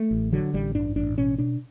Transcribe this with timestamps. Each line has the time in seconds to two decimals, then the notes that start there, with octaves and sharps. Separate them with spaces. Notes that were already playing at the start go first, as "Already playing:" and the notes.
Already playing: A3
0.11 A1
0.33 D3 F#3
0.54 A1 G3
0.75 G2 D4
0.96 A1 D4
1.17 B2 C#4
1.38 B2 D4